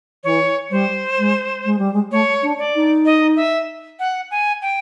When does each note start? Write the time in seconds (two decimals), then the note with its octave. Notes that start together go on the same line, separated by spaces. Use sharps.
0.24 E3 C#5
0.70 G3 C5
1.18 G#3
1.65 G#3
1.78 G3
1.93 G#3
2.11 A3 C#5
2.43 D4
2.58 D5
2.75 D#4
3.06 D#5
3.36 E5
3.99 F#5
4.31 G#5
4.62 G5